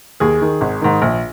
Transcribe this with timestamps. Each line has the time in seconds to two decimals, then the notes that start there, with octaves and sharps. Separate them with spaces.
0.20 D#2 G#4
0.42 D#3
0.61 G#1
0.81 G#2 D#3
1.02 A#1